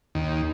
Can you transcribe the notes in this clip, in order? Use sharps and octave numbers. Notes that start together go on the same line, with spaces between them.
D#2